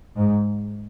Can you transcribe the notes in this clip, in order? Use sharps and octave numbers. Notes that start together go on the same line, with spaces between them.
G#2